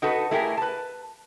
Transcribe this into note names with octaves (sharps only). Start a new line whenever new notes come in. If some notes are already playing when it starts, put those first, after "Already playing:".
D#4 F#4 A4 B4
A3 E4 G4 G#4 A#4
B4 A5